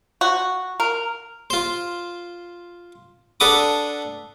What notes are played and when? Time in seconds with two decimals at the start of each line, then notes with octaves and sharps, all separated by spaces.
0.21 F#4
0.80 A#4
1.50 F4 C5
3.40 D4 A4 B4 F#5 D6 D#6